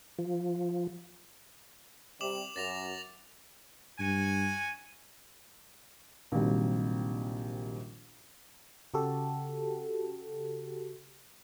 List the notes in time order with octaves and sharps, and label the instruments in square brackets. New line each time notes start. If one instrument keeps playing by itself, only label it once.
[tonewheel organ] F3
[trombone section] C3 G3 [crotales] D6 E7 F#7
[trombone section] F#2 [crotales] A6 A#6 F7
[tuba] G2 [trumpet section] F#4 G#5
[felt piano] A#1 C3 D#3 F#3 G3
[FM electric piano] C#3 F#4 G4 A4